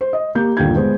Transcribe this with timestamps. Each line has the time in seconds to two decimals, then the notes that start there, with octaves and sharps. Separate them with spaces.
0.01 C5
0.13 D#5
0.35 A#3 G4 G6
0.57 G1 D#2 A#2 D3 G6 G#6
0.76 G#3 B3 C5